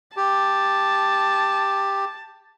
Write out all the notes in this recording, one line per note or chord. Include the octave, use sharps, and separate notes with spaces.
G4 A5